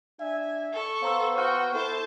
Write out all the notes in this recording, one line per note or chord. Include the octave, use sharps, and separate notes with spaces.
D4 E5 G#5
A4 C#6
B3 C5 F5 A#5 E6
F#4 C5 G5 C#6 F6
E4 A4 C5 A5